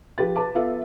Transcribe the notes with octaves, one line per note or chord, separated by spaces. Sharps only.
F3 G4 B4 A6
B4 A5 D6
B3 F4 A4 E5 F5